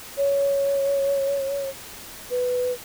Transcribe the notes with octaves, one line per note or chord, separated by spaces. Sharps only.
C#5
B4